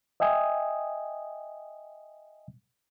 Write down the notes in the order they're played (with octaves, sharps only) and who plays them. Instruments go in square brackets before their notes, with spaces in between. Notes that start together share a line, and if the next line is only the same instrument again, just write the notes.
[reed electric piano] D#5 E5 G5 G#5 D#6